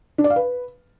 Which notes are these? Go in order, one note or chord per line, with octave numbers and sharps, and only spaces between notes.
D4
D5
F5
B4